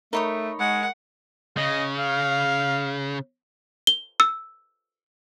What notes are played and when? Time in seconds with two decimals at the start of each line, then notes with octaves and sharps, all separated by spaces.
0.13 A3 D#4 A#4 C#5 B5 C#6 D#6
0.59 G#3 F#5
1.57 C#3 D#5
1.99 F5
3.87 G7
4.20 E6